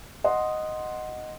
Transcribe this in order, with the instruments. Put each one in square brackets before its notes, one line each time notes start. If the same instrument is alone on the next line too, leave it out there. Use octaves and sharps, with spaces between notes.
[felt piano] D#5 F#5 C6